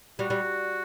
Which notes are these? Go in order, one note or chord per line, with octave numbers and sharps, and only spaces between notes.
G3 F#4
G3